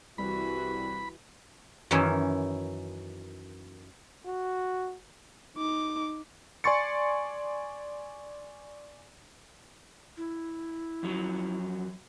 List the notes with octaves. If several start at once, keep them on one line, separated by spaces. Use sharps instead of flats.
C2 E3 G3 F#4 B5
F#2 D#3 E3 C#4 D#4 E4
F#4
D#4 D6
D5 G#5 C6 C#6 A6 C#7
E4
F2 F#3